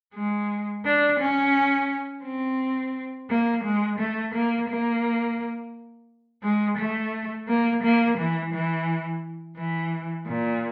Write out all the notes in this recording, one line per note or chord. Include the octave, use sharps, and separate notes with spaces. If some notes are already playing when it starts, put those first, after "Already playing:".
G#3
D4
C#4
C4
A#3
G#3
A3
A#3
A#3
G#3
A3
A#3
A#3
E3
E3
E3
A#2